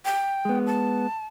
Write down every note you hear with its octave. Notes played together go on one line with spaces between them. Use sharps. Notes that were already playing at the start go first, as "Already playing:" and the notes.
G5
G#3 B3
A5